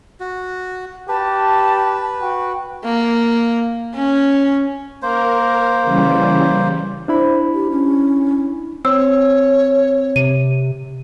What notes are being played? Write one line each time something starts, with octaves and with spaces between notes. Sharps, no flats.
F#4
G4 B4 A5
F#4 G5
A#3
C#4
A#3 A#4 C5
C#3 E3 G3
D4 E4 C5 B5
G4
C#4
C4 C#5 E6
C3 D#7